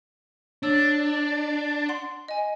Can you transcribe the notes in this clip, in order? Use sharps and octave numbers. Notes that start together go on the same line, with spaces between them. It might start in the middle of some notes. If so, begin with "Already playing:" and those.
D4 C#5 E6
F#5 C6
D#5 G#5